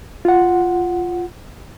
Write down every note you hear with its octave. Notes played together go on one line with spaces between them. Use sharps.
F4 F#5